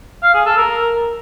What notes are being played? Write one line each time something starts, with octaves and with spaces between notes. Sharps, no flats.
F5
G#4
A4
A#4